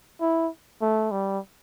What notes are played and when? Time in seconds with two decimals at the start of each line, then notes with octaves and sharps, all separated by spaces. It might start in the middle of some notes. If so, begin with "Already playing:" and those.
0.21 E4
0.81 A3
1.11 G3